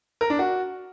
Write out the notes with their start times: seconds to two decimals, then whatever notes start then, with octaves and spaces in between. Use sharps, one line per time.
0.21 A#4
0.30 D4
0.39 F#4